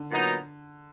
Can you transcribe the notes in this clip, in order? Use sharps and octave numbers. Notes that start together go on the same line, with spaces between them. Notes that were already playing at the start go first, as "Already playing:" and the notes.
Already playing: D3
A#2 F#3 B3 D#4